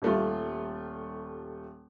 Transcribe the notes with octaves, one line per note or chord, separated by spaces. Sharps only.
D#1 G3 A3 F4